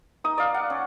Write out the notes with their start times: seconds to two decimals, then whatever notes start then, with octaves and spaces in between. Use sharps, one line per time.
0.24 D#4 D#6
0.38 D5 F5
0.54 F#5
0.70 C#4